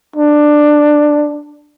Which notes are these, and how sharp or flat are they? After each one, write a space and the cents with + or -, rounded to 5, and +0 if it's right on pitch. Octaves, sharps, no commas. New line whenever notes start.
D4 +10